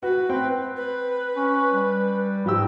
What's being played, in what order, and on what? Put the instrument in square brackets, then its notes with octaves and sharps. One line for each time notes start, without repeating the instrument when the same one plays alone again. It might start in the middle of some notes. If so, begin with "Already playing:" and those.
[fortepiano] F#4 [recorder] B4
[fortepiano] C4 G5
[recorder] B4
[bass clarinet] C#4
G3
[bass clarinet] G#2 [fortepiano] F3 G4 E6